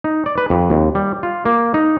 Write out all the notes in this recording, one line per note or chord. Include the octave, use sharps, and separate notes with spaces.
D#4
D5
B4
F2
D#2
G3
F4
A#3
D#4